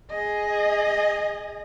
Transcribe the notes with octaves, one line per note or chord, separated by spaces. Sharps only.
G#4 D#5